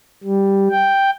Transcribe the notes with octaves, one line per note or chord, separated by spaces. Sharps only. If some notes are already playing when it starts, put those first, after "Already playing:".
G3
G5